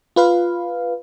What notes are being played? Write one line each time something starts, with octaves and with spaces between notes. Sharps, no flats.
F4 B4 F5